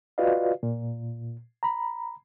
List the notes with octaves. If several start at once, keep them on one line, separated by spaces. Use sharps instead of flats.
F4 F#4 B4 D5 D#5 F5
A#2
A#5 B5